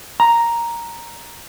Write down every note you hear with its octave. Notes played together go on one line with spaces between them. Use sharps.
A#5